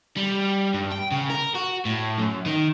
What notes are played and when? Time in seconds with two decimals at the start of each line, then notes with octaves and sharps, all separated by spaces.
0.17 G3
0.74 G2
0.92 G5
1.12 C#3
1.30 A#4
1.55 F#4
1.86 A2
2.19 F#2
2.46 D#3